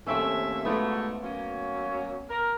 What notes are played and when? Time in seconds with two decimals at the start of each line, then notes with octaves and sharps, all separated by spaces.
0.06 D#2 A3 C4 C#4 E5
0.65 G#2 B2 A3 B3 F4 D5
1.23 F#3 A#3 C#4
2.29 A#4